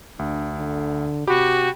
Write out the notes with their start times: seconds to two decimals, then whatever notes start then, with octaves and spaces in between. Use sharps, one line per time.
0.19 D2 D4
0.56 D3
1.27 C3 F#4 G4 G5 B5